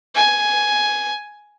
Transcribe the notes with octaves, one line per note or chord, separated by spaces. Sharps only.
G#5